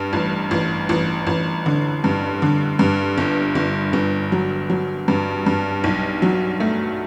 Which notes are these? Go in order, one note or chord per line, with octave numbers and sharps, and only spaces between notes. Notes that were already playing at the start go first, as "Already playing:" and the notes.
Already playing: G2
A1
A1
A1
A1
D3
G2
D3
G2
G1
G1
G1
F#3
F#3
G2
G2
B1
F#3
A3